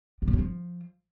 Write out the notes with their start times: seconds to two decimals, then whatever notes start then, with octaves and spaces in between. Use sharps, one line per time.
0.22 D3
0.28 A2
0.33 F#3
0.39 F3